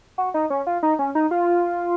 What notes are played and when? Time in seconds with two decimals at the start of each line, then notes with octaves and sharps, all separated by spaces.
0.18 F#4
0.34 D#4
0.50 C#4
0.67 F4
0.83 D#4
0.99 C#4
1.15 D#4
1.31 F4